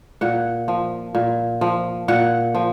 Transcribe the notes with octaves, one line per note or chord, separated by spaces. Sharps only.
A#2 F#5
F3
A#2
F3
A#2 F#5
F3